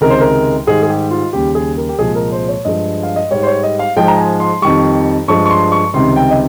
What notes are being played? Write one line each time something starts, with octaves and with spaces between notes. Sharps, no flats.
C#2 C3 D#3 G#3 A#4
C5
A#4
G#2 D#3 G3 G#4
G#4
G4
F4
D#2 C#3 G3 G4
G#4
A#4
G4
C2 A#2 F3 G#3 G#4
A#4
C5
C#5
G2 F3 G#3 D#5
F5
D#5
G#2 G3 C#5
C5
C#5
D#5
F5
G#2 F3 G#3 G5
A#5
G#5
C6
F2 D#3 G3 C#6
G2 F3 G#3 C#6
C#6
C6
C#6
C#2 C3 D#3 G3 C6
G5
D#5